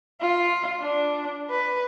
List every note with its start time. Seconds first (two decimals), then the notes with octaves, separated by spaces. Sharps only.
0.21 F4
0.81 D4
1.50 B4